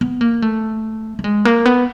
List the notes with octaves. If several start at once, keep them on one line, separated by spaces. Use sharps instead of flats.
B3
A#3
A3
A3
G#3
A#3
B3